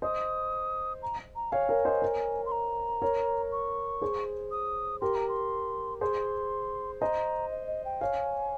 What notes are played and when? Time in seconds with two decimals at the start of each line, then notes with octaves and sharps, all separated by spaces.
0.02 C5 D#5 D#6
1.02 A#5
1.35 A#5
1.52 C#5 F5 G#5
1.69 A#4 C#5
1.85 C5 D#5
2.02 A#4 C#5
2.46 C6
2.52 A#5
3.02 A#4 C#5
3.52 C#6
4.02 G#4 C5
4.51 D#6
5.01 G4 A#4 C6
5.15 A#5
5.28 C6
6.01 G#4 C5 C6
7.01 C5 D#5 A#5
7.51 D#5
7.67 D#5
7.85 G5
8.01 C#5 F5 G#5